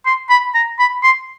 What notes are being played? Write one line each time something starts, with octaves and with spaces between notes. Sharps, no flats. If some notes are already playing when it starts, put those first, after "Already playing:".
C6
B5
A#5
B5
C6